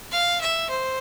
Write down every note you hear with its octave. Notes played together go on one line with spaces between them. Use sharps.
F5
E5
C5